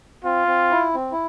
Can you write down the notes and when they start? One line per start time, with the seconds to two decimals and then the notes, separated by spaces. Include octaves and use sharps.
0.24 C4 F4
0.47 C4
0.71 E4
0.95 C4
1.12 E4